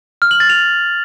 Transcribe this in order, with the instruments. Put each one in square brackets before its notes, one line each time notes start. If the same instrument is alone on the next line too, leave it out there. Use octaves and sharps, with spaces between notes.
[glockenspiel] F6
F#7
A6
F7